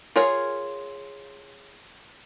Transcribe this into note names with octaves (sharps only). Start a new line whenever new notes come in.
F4 G#4 A#4 C#5